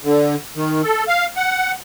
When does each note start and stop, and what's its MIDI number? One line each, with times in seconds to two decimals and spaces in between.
0.04 0.35 50
0.56 0.82 51
0.83 1.04 69
1.08 1.26 77
1.36 1.72 78